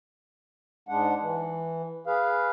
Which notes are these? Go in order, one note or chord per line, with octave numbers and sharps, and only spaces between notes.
G#2 G#3 D4 F#5
E3
G#4 B4 F5